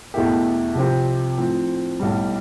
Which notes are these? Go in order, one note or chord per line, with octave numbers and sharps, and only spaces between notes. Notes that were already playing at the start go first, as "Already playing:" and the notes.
E2 B2 A3 E4 G4
C2 C3 F3 C4 G4
A2 F3 C4
B1 A2 G3